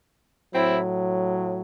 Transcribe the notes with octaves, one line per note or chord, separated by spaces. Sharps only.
A2 F#3 C4 E4